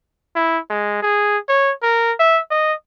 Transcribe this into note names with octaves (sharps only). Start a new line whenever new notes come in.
E4
G#3
G#4
C#5
A#4
E5
D#5